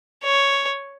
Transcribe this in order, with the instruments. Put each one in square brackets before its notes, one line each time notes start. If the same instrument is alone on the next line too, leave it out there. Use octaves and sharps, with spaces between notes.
[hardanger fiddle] C#5